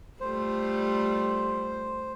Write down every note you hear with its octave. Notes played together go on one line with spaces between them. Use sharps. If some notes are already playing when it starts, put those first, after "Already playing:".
G3 A3 F4 C5